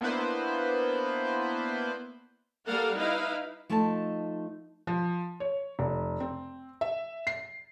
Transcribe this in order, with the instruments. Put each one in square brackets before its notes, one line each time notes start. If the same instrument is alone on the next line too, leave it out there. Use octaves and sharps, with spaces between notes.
[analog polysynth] A#3 B3 D4 E4 B4 C5
[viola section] G3 A#3 A4 A#4 F5 F#5
D#4 E4 B4 F5
[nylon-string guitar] F3 A3 D#4 D#5 G5 A5
[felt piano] F3
C#5
F1
C4
E5
C7